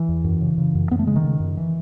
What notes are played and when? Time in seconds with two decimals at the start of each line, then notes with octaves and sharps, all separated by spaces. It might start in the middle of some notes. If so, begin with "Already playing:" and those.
Already playing: E3
0.09 E2
0.24 F#2
0.41 C#3
0.58 C#3
0.75 F#2
0.91 F#2 B3
0.99 A3
1.07 C#3 G#3
1.16 D#3
1.24 C#3
1.40 F#2
1.57 E3